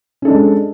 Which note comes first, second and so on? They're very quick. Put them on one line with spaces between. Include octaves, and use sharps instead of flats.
C#4 A4 D4 G#3